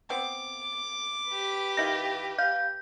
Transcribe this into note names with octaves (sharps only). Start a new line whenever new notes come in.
B3 C4 D6
G4 B4
D#3 E4 F4 A#6
F5 G6